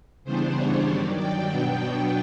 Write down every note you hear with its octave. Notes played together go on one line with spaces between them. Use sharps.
C#3 E3 G3 B3 D4 C5
C#5
G2 D#3 F#3 D5
G5
B2 F#3 B3 D4 G5